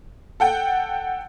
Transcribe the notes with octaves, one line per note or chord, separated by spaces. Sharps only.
A4 F#5 G5